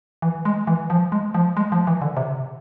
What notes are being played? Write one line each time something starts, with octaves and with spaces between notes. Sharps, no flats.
E3
G#3
E3
F3
G#3
F3
G#3
F3
E3
D3
C3